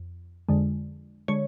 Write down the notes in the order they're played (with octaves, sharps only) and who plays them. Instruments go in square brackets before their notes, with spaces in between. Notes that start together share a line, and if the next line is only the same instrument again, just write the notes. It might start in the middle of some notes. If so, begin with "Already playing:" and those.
Already playing: [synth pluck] F2
F2 D3 G#3
D3 G#3 C#5